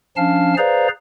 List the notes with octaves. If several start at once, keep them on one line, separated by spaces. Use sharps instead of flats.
F3 C#4 D4 F5 A5 F6
G#4 B4 C5 D5 F5 A#5